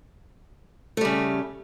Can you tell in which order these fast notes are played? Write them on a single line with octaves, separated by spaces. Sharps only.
A3 G3 C#3